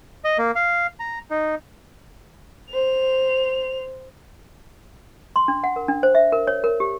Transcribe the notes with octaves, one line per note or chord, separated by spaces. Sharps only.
D#5
A#3
F5
A#5
D#4
C5 F7
C6
D4
F#5
A#4
D4
C5
E5
A#4
C#5
A#4
G4